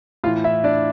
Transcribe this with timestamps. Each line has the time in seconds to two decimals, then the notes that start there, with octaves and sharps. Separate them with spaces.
0.24 A2 F4 F5
0.27 E3
0.44 E4 E5
0.64 D4 D5